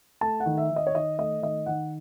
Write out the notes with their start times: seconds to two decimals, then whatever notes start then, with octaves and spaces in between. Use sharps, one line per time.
0.21 A3 A5
0.40 F#5
0.46 D#3
0.58 E5
0.70 D#3
0.76 D#5
0.87 C#5
0.95 D#3 D#5
1.18 A3 D#5
1.42 D#3 D#5
1.66 D#3 F#5